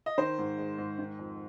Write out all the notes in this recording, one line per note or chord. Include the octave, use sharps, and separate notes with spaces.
D#5
D#3 C5
G#2
G#3
G#2
D#3
F2